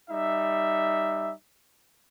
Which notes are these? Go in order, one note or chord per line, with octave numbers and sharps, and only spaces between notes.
G3 D#4 E5